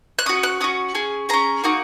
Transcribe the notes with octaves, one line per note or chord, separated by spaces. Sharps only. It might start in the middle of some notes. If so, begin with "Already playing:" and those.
F#6
C#4 F#4 D#6
F#6
C#4 F#4 D#6
C#4 G#4
C#4 G#4 A#5
A#3 D#4 F#4